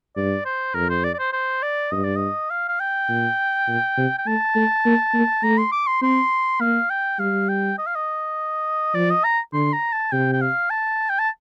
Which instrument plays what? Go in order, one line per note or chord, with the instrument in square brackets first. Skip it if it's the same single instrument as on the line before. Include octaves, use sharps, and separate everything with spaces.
[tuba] G2 [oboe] D5
[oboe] C5
[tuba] F2 [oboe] A#4
[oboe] C5
D5
D5
C5
C5
D5
[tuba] G2 [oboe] D#5
[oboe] D5
D#5
F5
F5
G5
[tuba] A#2
A#2
C3
[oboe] G5
[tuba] A3 [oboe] A5
[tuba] A3
A#3
A#3
[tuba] A3 [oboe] A#5
[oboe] C6
D6
C6
[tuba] C4 [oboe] C6
[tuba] A#3 [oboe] F5
[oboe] G5
[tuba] G3 [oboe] F5
[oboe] G5
D#5
F5
D#5
[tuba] F3 [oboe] D5
[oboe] D#5
A#5
[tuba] D3 [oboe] C6
[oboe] A#5
A5
[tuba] C3 [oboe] G5
[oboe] G5
F5
A5
G5
A5